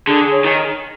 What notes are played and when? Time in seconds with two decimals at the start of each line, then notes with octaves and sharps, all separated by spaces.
0.07 D3 G#4
0.32 C#5
0.44 D#3